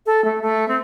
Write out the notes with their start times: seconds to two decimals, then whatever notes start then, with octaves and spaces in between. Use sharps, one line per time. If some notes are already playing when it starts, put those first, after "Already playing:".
0.06 A4
0.25 A3
0.42 A3
0.68 C4